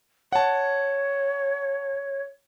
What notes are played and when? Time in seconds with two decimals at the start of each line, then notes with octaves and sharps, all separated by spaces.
0.32 C#5 F#5 A5